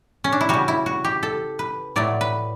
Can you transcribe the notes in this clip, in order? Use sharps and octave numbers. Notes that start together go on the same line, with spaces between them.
C#4
D4
E4
C#3 G3 F#4
E4
F#4
G4
A4
B4
A2 F#3 A3 D5
B4